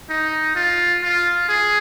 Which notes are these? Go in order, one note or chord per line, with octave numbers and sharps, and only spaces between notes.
D#4
F4
F4
G#4